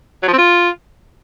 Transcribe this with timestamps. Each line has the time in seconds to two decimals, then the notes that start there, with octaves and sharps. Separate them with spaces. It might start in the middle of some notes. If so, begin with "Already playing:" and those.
0.23 F#3
0.28 F3
0.33 C4
0.38 F4